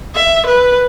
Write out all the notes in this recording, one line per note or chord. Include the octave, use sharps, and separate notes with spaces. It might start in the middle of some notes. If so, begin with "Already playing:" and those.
E5
B4